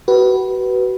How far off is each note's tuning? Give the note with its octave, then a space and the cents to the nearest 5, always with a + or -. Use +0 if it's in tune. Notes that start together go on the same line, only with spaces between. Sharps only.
F#4 +35 B4 -5